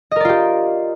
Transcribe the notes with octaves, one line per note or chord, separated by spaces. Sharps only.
F4 G4 A#4 D5 D#5